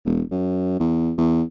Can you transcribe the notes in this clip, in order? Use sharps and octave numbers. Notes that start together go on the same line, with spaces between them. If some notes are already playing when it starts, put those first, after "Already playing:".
E1
F#2
E2
E2